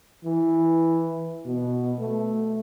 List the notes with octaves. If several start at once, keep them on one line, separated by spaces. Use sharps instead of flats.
E3
B2
A3